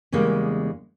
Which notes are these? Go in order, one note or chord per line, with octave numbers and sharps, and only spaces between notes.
E2 C#3 G3 G#3 A#3